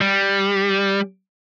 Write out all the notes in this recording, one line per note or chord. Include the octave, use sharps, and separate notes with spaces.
G3